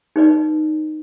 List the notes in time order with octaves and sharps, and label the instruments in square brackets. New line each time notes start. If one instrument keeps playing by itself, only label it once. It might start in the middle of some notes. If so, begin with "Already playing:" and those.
[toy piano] D#4 B4 D5